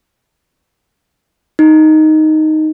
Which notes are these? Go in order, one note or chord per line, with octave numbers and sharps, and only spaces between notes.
D#4